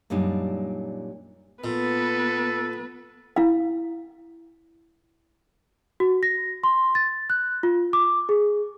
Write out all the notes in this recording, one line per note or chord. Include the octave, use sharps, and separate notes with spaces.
F#2 A#2 G3 D4 D#4
A#2 B3 A4 B4
E4 F5
F#4
A#6
C6
A6
F#6
F4
D6
G#4